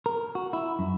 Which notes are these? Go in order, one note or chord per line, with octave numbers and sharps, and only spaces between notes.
A#4
F#4
E4
F#2